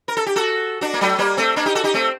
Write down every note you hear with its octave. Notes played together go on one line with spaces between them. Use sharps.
A#4
A4
G4
F#4 A4
D4 F#4
A#3
F#3 A3
G3 A#3
A3 C4
A#3 D4
D#4 G4
F#4 A4
D#4 G4
A3 C4